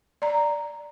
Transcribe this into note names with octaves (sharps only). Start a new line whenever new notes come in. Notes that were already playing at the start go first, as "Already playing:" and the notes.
D5 A#5